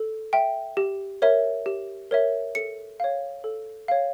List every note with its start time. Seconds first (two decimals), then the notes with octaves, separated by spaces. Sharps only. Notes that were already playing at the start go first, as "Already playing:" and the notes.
Already playing: A4
0.33 E5 G5
0.77 G4
1.22 A#4 C#5 E5
1.66 G4
2.11 A#4 C#5 E5
2.55 A4 C#7
3.00 C#5 F5
3.44 A4
3.88 C#5 F5